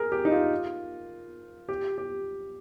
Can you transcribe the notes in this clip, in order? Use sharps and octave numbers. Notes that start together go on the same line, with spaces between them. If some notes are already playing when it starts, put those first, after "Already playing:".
Already playing: G#4 A#4
G4
D#4
F4
G4
G4